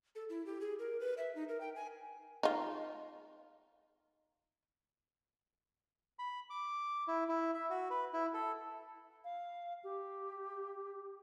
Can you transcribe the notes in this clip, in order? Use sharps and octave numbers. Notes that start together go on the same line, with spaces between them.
A4
E4
G4
G#4
A#4
B4
E5
D#4
A#4
G5
G#5
D#4 F4
B5
D6
E4
E4
E5
F#4
B4
E4
A4
F5
G4